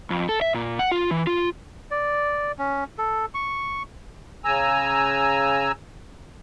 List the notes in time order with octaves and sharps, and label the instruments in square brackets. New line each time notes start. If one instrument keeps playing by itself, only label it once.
[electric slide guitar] F2
A4
E5
A#2
F#5
F4
E3
F4
[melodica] D5
C#4
A4
C#6
[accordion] C#3 G#5 A#5 E6